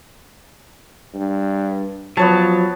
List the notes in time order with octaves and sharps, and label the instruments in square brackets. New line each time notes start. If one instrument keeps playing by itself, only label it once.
[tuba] G2
[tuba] F3 [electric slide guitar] F#3 [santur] B3 C#5 A5